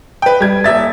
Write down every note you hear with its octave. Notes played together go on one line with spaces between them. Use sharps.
B4 G5
G3 G#6
D#1 E5 A6